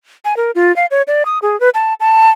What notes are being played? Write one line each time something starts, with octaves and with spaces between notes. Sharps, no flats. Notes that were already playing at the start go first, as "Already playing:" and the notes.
G#5
A#4
F4
F5
C#5
D5
D#6
G#4
B4
A5
A5